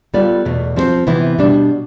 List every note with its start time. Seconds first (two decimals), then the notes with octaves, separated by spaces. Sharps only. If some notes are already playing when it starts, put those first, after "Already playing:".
0.14 G3 B3 F4 A4 D5
0.45 E2 B2 A3
0.76 F3 C4 G4 C5
1.07 C3 E3 B3 E4
1.38 B2 G3 D4